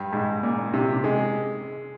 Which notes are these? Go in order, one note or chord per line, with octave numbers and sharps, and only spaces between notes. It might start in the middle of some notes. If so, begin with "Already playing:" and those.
Already playing: G2
G#2
A#2
C3
G#3